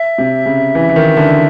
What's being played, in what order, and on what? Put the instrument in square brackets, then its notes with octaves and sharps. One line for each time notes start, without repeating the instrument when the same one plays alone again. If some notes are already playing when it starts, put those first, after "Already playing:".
Already playing: [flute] E5
[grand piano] C3
C#3
E3
E3
D#3
D3